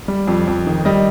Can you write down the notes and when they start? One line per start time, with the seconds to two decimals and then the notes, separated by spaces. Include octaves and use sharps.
0.08 G3
0.27 F2
0.47 F2
0.67 D#3
0.85 G3 D#5